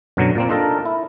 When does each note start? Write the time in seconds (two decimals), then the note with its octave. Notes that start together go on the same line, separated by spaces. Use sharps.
0.17 F#2 B2 D3 F#3
0.35 A#2 A#3 C4
0.49 D4 D#4 F4 A4 A#4
0.85 E4